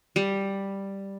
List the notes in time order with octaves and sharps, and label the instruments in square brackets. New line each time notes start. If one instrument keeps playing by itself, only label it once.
[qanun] G3